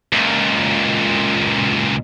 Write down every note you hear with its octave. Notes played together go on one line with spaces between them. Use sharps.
C#2 A#2